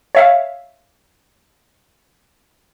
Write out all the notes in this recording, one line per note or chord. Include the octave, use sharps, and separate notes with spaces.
C#5 E5 F5